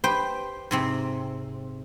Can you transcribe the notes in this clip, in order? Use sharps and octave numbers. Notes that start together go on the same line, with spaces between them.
G4 B4 C5 G5
G#2 C3 C4